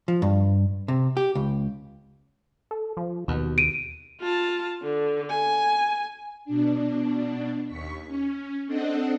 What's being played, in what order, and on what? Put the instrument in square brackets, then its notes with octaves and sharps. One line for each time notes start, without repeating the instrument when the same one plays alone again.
[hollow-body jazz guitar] F3
G2
C3
G4
C#2
[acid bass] A4
F3
[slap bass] D#2 [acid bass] B2
[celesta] D7 D#7
[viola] F4 A5
D3
G#5
[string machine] B2 D4
D#2 C#6 B6
C#4
C4 D4 A4 D#5 F#5